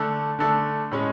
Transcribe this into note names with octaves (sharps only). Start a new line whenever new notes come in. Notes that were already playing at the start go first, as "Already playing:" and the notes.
Already playing: D3 A3 D4 A4
D3 A3 D4 A4
A2 G#3 C#4